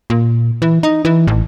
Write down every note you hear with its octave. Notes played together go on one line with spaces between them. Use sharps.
A#2
E3
D#4
E3
A1